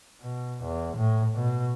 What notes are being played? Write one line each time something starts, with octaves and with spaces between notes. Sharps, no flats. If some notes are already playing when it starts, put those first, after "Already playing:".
B2
E2
A2
B2